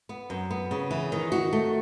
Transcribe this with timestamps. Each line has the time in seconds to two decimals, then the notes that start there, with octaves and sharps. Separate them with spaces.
0.09 B3
0.30 F#2
0.50 B3
0.71 C#3
0.91 E3
1.12 D#3
1.32 F#4
1.53 A3